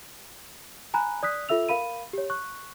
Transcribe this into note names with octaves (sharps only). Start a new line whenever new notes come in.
G#5 A#5 B5 F#6
D5 D#6 F#6 B6
F4 A4 E5 E6 F7
A#4 F5 B5 D#7
G4 C#5
C#6 F#6